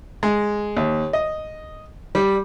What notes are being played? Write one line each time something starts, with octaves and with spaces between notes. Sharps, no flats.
G#3
D#2
D#5
G3